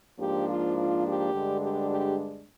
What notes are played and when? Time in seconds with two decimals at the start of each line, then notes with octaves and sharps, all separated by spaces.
0.20 G#2 F3 A#3 D4 G4
0.48 F4
0.77 F4
1.06 G4
1.34 G2 D3 G#3 D4
1.62 G4
1.90 G4